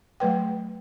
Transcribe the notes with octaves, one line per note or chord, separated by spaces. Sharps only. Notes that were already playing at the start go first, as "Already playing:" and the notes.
F#3 A3 B4 G5